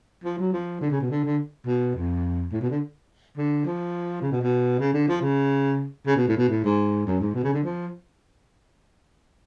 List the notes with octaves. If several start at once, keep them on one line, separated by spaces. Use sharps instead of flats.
F3
F#3
F3
D3
C#3
B2
D3
D3
B2
F2
A2
B2
D3
D3
F3
C#3
B2
B2
C#3
D3
F3
C#3
C#3
B2
A2
B2
A2
G#2
F#2
G#2
B2
C#3
D3
F3